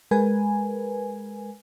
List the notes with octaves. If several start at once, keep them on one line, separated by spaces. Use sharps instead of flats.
G#3 A#4 B4 G#5